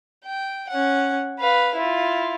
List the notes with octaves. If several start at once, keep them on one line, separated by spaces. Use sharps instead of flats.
G5
C#4 F#5
B4 F5
E4 F4